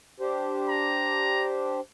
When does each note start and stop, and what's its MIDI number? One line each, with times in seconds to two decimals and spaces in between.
0.20 1.80 62
0.20 1.80 67
0.20 1.80 72
0.69 1.47 82